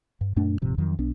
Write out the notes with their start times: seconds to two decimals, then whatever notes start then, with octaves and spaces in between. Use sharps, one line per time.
0.21 G2
0.36 F#2 A#2 A3 D4
0.62 D#1 G#2 C3 F3
0.78 F2 D#3 F#3
0.99 B1 B3 D4